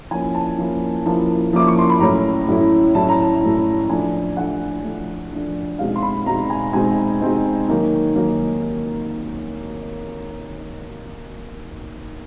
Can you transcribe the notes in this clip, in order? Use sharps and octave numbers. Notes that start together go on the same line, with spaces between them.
F3 A#3 C#4 E4 G#5
A5
F3 A#3 C#4 E4
F3 A#3 C#4 E4 A5
F3 A#3 C#4 E4 D6
C#6
C6
B5
A2 F#3 A3 C#4 E4 A#5
A2 F#3 A3 C#4 E4
A2 F#3 A3 C#4 E4 A5
A#5
A5
A2 F#3 A3 C#4 E4
F3 A3 D4 G#5
F3 A3 D4 F#5
F3 A3 D4
F3 A3 D4
B2 G#3 C4 D#4 F5
C6
B5
B2 G#3 C4 D#4 A#5
G#5
B2 G#3 C4 D#4 G#5
B2 G#3 C4 D#4
D#3 F#3 A#3 D#4
D#3 F#3 A#3 D#4